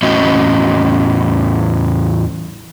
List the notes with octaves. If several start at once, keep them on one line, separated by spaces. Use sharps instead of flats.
E2 A2 C#4 F#4 D#5